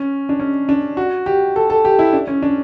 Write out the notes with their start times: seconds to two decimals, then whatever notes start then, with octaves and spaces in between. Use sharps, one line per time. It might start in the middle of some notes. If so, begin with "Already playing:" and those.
Already playing: C#4
0.29 D4
0.40 C#4
0.69 D4
0.97 F#4
1.26 G4
1.56 A4
1.70 A4
1.85 G4
1.99 E4
2.13 D4
2.27 C#4
2.42 D4